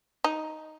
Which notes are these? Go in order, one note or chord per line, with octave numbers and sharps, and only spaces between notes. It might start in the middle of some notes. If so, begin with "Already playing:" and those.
D#4